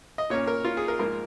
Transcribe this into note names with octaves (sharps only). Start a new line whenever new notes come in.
D#5
A#2 A#3 C#4 C#5
A#4
F4
G#4
A#4
G#2 F3 A#3 A#4